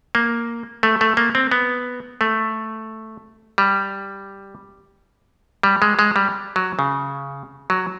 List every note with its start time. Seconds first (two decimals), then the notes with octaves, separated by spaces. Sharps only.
0.15 A#3
0.83 A3
1.01 A3
1.17 A#3
1.35 C4
1.51 B3
2.21 A3
3.58 G3
5.63 G3
5.82 G#3
5.99 G#3
6.16 G3
6.56 F#3
6.79 C#3
7.70 F#3